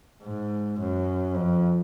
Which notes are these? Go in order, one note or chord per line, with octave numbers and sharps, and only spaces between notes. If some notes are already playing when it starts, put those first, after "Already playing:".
G#2
F#2
F2